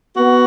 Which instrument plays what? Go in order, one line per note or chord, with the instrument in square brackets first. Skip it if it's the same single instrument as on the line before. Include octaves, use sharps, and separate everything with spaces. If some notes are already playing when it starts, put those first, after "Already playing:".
[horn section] B3 F#4